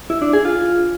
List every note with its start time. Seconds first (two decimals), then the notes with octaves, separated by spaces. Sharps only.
0.10 E4
0.22 D4
0.33 G#4
0.45 F4